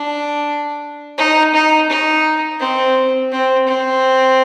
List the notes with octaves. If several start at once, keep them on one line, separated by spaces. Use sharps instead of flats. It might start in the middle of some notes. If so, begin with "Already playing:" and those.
Already playing: D4
D#4
D#4
D#4
C4
C4
C4